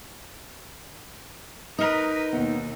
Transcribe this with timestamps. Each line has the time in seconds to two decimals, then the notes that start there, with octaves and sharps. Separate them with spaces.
1.79 D#4 A#4 B4 D#6 F6
2.33 D#2 B2 B3